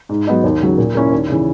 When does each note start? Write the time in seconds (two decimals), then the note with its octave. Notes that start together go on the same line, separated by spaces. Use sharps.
0.09 G#2
0.27 F#3 B3 D#4
0.44 D#2
0.61 C#3 F#3
0.78 A#2
0.95 A#3 C#4 E4
1.12 D#2
1.29 C#3 E3